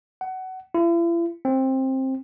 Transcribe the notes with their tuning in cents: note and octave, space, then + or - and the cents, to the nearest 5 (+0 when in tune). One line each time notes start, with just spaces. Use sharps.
F#5 +20
E4 +45
C4 +15